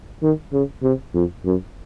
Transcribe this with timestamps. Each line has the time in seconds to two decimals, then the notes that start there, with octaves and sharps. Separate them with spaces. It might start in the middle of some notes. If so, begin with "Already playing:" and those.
0.23 D#3
0.53 C#3
0.83 C3
1.14 F2
1.45 F#2